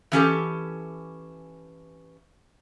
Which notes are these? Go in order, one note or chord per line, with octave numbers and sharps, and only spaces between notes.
E3 C#4 G4 A4